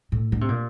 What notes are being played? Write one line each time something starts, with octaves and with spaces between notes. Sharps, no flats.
A2
D3
C3
A#2